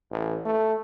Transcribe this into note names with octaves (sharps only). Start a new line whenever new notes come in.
A1
A3